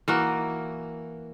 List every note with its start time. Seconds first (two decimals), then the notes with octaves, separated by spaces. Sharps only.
0.08 E3 A#3 F#4